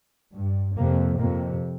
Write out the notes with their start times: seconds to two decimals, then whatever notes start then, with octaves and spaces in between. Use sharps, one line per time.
0.33 G2
0.76 F2 C3 A#3
1.18 F2 C3 A#3